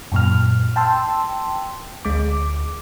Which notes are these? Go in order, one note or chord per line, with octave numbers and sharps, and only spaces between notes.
F#2 A#2 F6
G5 A5 C6 E6
D2 G#3 D6